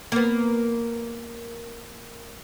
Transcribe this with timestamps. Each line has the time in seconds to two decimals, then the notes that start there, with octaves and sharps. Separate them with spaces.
0.12 A#3 B3